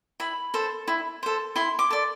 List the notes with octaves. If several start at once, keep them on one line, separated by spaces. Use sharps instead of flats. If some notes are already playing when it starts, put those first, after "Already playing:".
E4 B5
A4 C5
E4
A4 C5
E4 C6
D6
A4 D5